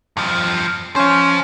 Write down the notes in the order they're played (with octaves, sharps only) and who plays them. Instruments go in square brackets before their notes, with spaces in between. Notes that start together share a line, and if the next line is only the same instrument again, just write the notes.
[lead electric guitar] G2 F3
[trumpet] C#4 [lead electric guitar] C5 F5